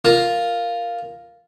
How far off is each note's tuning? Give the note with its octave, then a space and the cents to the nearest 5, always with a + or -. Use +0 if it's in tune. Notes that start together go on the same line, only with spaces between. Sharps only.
F4 +0 A#4 +0